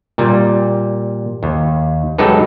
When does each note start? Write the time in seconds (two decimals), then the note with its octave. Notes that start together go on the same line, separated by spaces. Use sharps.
0.18 A#2 G3
1.43 D#2
2.18 F#3 G#3 D#4 G4 A4 B4